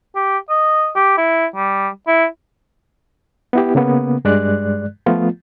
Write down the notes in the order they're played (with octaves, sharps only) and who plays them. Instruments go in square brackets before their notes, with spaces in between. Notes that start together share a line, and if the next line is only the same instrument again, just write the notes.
[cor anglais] G4
D#5
G4
E4
G3
E4
[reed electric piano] B3 E4 G4
C#3 A#3 B3
G2 G#3 D5 F#6
F3 A3 B3 F4